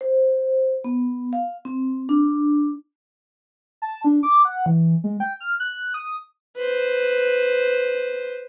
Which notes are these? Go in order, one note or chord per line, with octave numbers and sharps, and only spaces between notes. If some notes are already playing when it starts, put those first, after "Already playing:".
C5
B3
F5
C4
D4
A5
D4
D6
F#5
E3
G#3
G5
F6
F#6
D#6
B4 C5